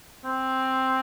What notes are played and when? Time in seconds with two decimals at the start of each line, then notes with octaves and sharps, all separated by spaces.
0.25 C4